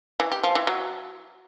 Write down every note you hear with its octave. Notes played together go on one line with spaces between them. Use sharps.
E3
G4
F3
E3
F#3